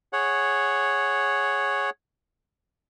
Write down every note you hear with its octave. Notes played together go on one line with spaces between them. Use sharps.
G#4 C#5 F#5